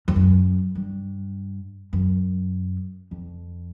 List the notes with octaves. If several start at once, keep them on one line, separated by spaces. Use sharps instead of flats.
F2
F#2
G2
F#2
F2